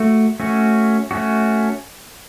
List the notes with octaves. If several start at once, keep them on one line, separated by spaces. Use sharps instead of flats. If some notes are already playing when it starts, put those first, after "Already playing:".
Already playing: A3 F#4
A3 C#4 F#4
A3 C#4 F#4